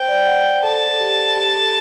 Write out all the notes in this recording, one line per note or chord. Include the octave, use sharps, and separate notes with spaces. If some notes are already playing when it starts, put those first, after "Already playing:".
Already playing: C5 G5
D5
F#5
C5
A4 A5
A4
G4
G4
A4